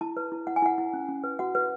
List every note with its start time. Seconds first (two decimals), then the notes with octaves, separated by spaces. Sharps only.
0.01 E4 A5
0.17 B4
0.32 E4
0.47 E4 F#5
0.56 G#5
0.62 E4 F#5
0.78 E4
0.93 C#4
1.09 C#4
1.24 B4
1.39 F#4 F#5
1.55 B4